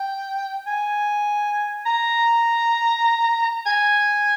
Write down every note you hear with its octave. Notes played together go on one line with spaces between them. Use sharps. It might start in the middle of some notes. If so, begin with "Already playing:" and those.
Already playing: G5
G#5
A#5
G#5